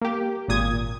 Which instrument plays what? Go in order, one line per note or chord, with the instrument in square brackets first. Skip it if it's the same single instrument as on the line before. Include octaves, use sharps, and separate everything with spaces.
[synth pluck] A#3 G4
G#1 A#2 D#6 G#6